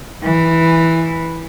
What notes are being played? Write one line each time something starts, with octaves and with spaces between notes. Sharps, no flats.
E3